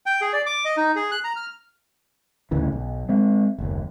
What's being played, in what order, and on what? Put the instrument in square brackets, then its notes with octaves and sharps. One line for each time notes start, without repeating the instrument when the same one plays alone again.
[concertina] G5
G#4
D5
D6
D#5
D#4
G#4
F#6
A#5
F6
[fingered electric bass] A1 D2 C#3 E3
B1
G#3 C4
F#1 D#2